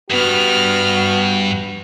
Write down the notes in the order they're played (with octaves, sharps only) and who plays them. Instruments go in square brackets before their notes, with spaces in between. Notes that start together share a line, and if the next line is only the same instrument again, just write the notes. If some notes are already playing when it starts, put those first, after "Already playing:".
[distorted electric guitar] G2 [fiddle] B3 F6 [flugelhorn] F#4